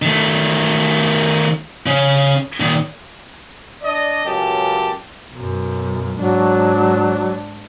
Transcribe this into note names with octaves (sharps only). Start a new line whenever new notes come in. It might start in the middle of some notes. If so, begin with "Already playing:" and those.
D#3 A3
C#3 C#4
A#2 D#3
D4 D5 D#5
C#2 F#2 G4 A5
B1 F#2
G#2 F#3 D4